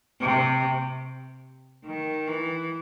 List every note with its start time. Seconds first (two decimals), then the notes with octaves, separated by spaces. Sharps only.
0.20 C3
1.85 D#3
2.27 E3